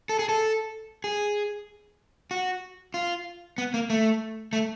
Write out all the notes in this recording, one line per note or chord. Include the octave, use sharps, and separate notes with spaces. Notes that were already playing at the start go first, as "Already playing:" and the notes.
A4
G#4
A4
G#4
F#4
F4
B3
A#3
A3
A3